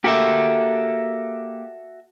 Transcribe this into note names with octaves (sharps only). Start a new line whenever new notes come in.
A#3 F#4 G4 A4 E5